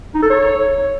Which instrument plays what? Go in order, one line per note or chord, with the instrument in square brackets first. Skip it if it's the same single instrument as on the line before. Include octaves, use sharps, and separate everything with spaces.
[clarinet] D#4
A4
C#5